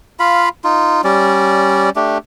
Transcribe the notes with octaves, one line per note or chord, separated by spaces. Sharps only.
F4 F5 B5
D#4 F4
G3 C#4 D5
A3 D4 G4